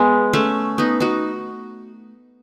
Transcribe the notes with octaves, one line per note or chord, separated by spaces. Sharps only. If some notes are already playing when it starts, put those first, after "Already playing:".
Already playing: G#3 B3
A3 C#4
B3 D#4
D#4 F#4